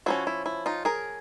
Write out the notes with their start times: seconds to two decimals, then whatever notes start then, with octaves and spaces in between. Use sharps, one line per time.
0.06 F3 A#3 C#4 E4 F#4
0.27 E4
0.46 E4
0.66 D#4 F4
0.85 G#4 A#4